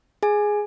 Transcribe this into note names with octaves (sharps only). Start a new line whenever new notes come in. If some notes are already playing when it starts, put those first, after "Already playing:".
G#4 G#5